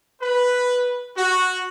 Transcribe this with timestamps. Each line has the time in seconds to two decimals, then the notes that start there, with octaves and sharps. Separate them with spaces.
0.22 B4
1.17 F#4